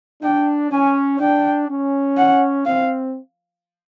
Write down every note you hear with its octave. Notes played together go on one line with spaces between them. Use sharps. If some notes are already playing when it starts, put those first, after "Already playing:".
D4 G5
C#4 G#5
D4 G5
C#4
F#5
C4 F5